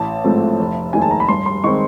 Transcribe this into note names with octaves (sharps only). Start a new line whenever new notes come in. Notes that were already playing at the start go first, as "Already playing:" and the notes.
Already playing: A1 A5
G#2 F3 A3 C4
F1
D#2 D#3 G#3 G#5
A5
A#5
B5
G2 C6
C6
D#3 G#3 C4 C#6